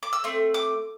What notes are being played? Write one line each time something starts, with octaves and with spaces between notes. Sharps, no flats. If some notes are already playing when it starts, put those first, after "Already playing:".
D6
E6
A3 C4
D6